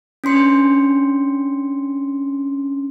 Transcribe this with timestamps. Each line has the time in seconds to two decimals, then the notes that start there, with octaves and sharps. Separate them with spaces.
0.24 C#4 D4 C6 C#7